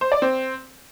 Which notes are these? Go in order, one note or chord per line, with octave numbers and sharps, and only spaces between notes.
C5
D5
C4